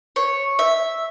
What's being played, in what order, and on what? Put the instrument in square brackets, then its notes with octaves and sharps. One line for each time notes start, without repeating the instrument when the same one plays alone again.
[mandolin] C#5
E5